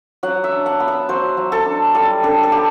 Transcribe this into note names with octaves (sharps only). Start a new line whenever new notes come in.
F#3 F#5
E5
D4
F#5
B3
E5
F#3 C5
F#3
A4
D4
G3 A4
D4 A4
A4
B3 G4